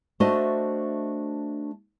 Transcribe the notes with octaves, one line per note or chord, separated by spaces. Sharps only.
A3 D4 F#4 C5 D#5 E5